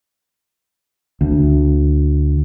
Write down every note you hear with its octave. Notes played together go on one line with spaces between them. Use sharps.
D2